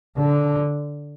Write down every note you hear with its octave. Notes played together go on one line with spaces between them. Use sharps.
D3